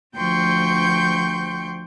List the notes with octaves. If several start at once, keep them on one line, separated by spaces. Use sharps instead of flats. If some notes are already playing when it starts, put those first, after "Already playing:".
D2 F3 G5 C6 C#6 G6